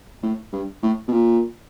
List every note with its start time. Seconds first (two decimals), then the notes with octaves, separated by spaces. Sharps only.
0.23 A2
0.53 G2
0.83 A2
1.08 B2
1.12 A#2